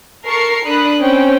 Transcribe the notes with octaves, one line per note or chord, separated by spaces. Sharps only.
A4 A#4 C#6 C7 C#7
D4 B5 D#6 F#6
C4 C#4 G5